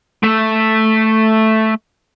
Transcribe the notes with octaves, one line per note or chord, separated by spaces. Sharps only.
A3 E5